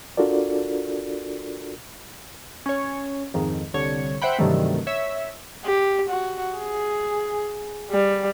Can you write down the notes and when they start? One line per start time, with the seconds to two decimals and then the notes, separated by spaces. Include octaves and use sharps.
0.17 D4 F4 F#4 A4 A#4 D5
2.66 C#4 C#5
3.34 F2 G#2 D#3
3.74 C2 D3 C#5
4.22 C5 E5 F#5 G5 B5
4.39 G2 C3 D#3 E3 F#3 A3
4.87 C#5 E5
5.65 G4
6.09 F#4
6.56 G#4
7.91 G3